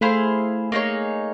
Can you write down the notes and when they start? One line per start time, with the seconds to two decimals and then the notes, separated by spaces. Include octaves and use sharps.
0.01 A3 E4 G#4 C5 F5
0.72 A#3 D#4 G#4 C#5